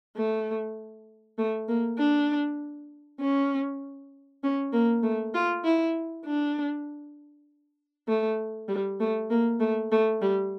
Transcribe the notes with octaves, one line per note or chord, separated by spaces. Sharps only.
A3
A3
A#3
D4
C#4
C#4
A#3
A3
F4
E4
D4
A3
G3
A3
A#3
A3
A3
G3